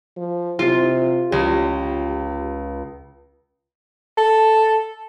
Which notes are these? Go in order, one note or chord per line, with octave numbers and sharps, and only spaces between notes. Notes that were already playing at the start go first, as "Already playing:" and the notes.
F3
C3 F4
C#2 G4
A4